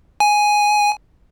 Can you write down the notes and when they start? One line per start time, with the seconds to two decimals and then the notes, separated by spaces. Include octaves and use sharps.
0.20 G#5